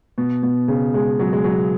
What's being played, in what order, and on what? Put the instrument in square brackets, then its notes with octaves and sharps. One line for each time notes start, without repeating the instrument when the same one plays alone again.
[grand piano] B2
B2
C#3
G#3
F#3
G#3
F#3